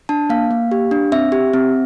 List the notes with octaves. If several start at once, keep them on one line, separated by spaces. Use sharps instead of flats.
D4 A5
A#3 F5
A#3
G4
D4
C4 E5
G4
C4